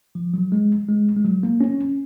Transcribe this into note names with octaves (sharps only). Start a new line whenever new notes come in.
F3
F#3
G#3
G#3
G#3
F#3
A#3
C#4